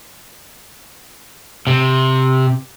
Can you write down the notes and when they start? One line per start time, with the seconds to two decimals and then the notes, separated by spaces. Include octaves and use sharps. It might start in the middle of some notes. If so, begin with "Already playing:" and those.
1.67 C3